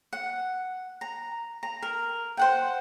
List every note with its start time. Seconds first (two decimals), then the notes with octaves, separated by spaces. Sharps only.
0.13 F#5
1.01 A#5
1.63 A#5
1.83 A#4
2.37 C5 F#5 G5